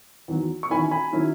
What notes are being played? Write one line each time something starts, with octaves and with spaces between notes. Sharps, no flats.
E2 D#3 F#3
C#6
E2 D#3 F#3 C#4 E4 G#5 B5
G#5 B5
D#3 F#3 C#4 E4